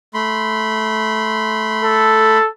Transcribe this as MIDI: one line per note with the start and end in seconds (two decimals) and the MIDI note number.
0.14 2.38 57
0.14 2.38 83
0.14 2.38 84
1.83 2.49 69